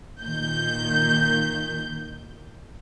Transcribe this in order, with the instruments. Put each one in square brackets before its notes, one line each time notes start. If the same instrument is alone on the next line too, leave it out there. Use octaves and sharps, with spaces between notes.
[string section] A#2 D#3 G6